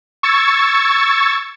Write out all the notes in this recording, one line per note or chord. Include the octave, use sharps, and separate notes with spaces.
C#6 E6 G#6 A6 C#7